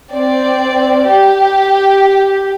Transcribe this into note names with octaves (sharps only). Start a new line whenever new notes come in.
C4 D5
G4